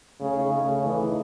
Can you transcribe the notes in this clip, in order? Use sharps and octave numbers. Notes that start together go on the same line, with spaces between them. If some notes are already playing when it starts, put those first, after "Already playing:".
C#3 A3
D#4
C#3 A3
G#4
E3 A3
D#4